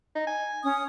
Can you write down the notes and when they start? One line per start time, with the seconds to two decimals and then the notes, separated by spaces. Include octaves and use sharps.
0.16 D#4
0.27 G#5
0.64 C#4 D#6